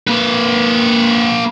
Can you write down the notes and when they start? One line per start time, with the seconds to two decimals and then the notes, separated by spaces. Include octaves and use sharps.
0.07 A#3 B4